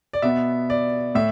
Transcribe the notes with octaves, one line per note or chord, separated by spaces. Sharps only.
D5
B2 B3 E5
D5
A2 E5